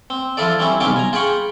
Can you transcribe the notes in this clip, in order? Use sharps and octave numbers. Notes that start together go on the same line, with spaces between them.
C4
F3 E4 F4 A4 D5
G3 C4 C#4 E4
B1 C3 G3 C#4 F4 D6
G#5 A#5
F4 G#4 G5 B5 C#6